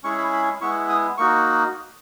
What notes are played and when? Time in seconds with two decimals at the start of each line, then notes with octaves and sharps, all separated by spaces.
0.04 G#3 C#4 E4 G#4 C#6
0.18 B5
0.33 B5
0.61 G#3 B3 E4 C#6
0.89 D#6
1.18 A#3 D#4 F#4 C#6